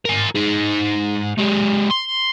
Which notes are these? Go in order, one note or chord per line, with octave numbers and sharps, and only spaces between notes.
A#4 G#5
D#4 G#4
G#3 G4
C6